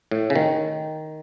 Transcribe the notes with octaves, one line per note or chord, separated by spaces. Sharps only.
A2
C#3
D#3